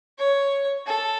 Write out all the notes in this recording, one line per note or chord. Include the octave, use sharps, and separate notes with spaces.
C#5
A4